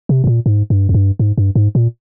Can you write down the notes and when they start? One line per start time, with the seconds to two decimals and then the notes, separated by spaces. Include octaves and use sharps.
0.09 C3
0.24 G#2
0.27 A#2
0.46 G#2
0.70 G2
0.89 F2
0.94 G2
1.19 G#2
1.38 G2
1.56 G#2
1.75 A#2